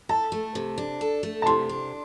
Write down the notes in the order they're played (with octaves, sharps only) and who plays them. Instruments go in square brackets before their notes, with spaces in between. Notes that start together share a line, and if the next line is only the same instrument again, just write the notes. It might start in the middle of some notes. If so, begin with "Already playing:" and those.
[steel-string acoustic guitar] A4 [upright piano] A5
[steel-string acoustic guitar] A3
C3
D4
A4
A3
[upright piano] A5
[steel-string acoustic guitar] C3 [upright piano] C6
[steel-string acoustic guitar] D4